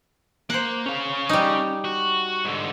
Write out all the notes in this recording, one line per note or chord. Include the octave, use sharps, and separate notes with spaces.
A#3 C5 F#5
C#4 F5
G3 D#4
F#4
G#2 D3